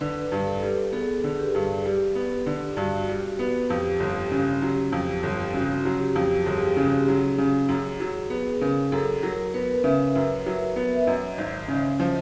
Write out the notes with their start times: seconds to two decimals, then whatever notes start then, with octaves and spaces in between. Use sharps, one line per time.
0.01 D3 B4
0.32 G2
0.47 A4
0.62 G3
0.92 B3 G#4
1.24 D3
1.39 G4
1.55 G2
1.85 G3
2.15 B3
2.46 D3
2.77 G2 F#4
3.09 G3
3.39 B3
3.69 F2 G4
4.00 G1
4.31 C#3
4.62 F#3
4.92 F2
5.23 G1
5.54 C#3 F#4
5.85 F#3
6.00 G4
6.16 F2
6.40 G4
6.46 G1 G#4
6.77 C#3
7.08 F#3
7.38 C#3
7.69 F#2
8.00 F#3
8.30 B3 G#4
8.61 C#3 A#4
8.92 F#2 A4
9.23 F#3 A#4
9.54 B3 B4
9.84 C#3 E5
10.15 F#2
10.46 F#3
10.76 B3
10.96 E5
11.07 F#2 D#5
11.38 G#1
11.68 C#3
12.00 F3